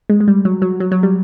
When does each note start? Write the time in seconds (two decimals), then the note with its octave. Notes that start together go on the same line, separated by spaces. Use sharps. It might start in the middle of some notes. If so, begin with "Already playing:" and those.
0.10 G#3
0.20 G#3
0.28 G3
0.45 F#3
0.62 F#3
0.80 F#3
0.92 F#3
1.03 G3